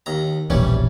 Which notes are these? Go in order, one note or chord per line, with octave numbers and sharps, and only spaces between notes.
D#2 A#5
E1 A#1 E3 G3 C#4